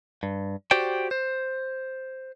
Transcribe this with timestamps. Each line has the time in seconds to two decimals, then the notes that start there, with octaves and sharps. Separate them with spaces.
0.23 G2
0.71 F#4 G4 C5 D5 G5
1.11 C5